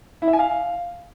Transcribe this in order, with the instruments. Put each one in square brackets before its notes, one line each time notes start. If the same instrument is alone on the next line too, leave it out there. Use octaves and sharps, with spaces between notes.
[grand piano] E4
E5
G#5
F5